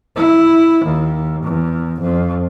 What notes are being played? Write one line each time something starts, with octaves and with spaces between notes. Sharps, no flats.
E4
D#2
E2
F2